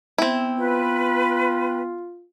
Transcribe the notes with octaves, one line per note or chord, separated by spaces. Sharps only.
B3 C4 E4 G5
F4 B4